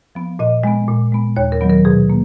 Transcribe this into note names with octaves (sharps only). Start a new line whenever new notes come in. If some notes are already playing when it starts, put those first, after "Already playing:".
F3 B3
A#2 D#5
G#3 B3
A#2
G#3 B3
D#2 C#5
A#4
D#3 F#3 B3
A#4
B2 G#4
A#3